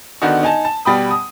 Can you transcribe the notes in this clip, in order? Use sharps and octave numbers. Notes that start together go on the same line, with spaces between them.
D3 D#3 B3 D4 D#4 F#4
D#4 G#5 A5
A5
B2 G3 G5 B5 D#6
D#6